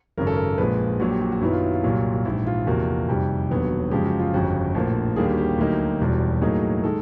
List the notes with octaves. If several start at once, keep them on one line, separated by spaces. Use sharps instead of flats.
G#1 F#2 C#3 A#4
A4
A#4
A#1 A#2 F3 G#3 B4
A#1 A#2 F#3 F#4
G4
F#4
F#4
F#2 D#3 F#3 B3 E4
F4
E4
F4
C2 A#2 F#3
F4
A#1 G#2 E3 E4
F4
E2 C3 F3 A#3 F#4
F2 C3 D#3 G3
E1 D#2 D3 F#3 B3
F#2 C#3 F3 G#3 G4
F#4
F4
G1 F2 C#3 F#4
A#1 A2 F3 A#3
D#2 D3 G3 A#3 G#4
G4
F#4
G4
D2 D3 F#3 A#3 D#4
E1 E2 B2 G3
A2 F#3 A#3 D#4 G#4
D#3 G#3 A4